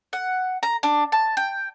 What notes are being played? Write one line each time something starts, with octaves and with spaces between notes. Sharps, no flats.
F#5
A#5
D4
A5
G5